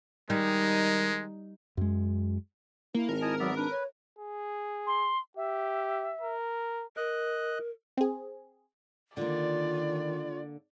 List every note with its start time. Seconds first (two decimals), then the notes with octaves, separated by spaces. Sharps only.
0.30 D#3 G3 G#3 D#4
1.77 F#2 G#3
2.94 A#3 E4
3.09 G#1 A#4
3.22 E4 D#5 G#5 A5
3.40 F#3 B3 D5 E5
3.56 D4 B4
3.71 C#5
4.19 G#4
4.87 C6
5.37 G4 E5
6.21 A#4
6.97 A#4 D#5 F#6
7.97 C4 G#4
9.17 D3 D#3 A#3 F4 D5